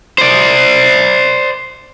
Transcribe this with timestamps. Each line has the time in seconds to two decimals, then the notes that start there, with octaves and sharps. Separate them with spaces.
0.18 C5 D5